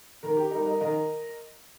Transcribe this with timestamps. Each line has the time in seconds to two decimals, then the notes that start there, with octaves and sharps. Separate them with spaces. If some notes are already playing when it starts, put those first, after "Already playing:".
0.23 D#3 A#4
0.37 G4
0.51 G3 D#4 A#4
0.66 A#4 D#5
0.81 D#3 A#4 D#5